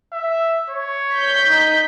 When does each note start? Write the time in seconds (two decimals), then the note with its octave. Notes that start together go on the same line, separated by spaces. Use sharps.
0.13 E5
0.70 C#5
1.15 G6 B6
1.48 D#4